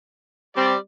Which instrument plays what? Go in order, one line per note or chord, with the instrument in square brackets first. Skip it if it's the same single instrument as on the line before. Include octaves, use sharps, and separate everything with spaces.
[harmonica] G3 D5 [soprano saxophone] C4